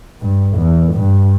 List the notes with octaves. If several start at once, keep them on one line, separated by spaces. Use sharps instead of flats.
G2
E2
G2